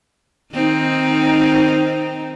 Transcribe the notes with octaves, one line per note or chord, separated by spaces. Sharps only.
D#3 C4 D#4